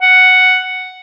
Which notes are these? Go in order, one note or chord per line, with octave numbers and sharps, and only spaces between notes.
F#5